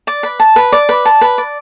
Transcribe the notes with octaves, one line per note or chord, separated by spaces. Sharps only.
D5
B4
A5
B4
D5
B4
A5
B4
D5